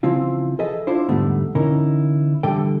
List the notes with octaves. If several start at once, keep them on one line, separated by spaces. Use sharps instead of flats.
C#3 E3 F3 C4 E4 F4
G#4 A4 B4 D#5 E5 A5
D4 E4 F4 C5
E2 G#2 D3 G3 A3 B3
D3 E3 C#4 D#4 E4 A#4
D3 E3 G3 A4 G5